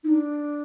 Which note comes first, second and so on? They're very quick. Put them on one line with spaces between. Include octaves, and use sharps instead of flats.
D#4 E4 D4